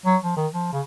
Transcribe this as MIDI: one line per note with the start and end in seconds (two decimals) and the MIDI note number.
0.06 0.17 54
0.23 0.37 53
0.37 0.47 51
0.53 0.68 53
0.73 0.81 49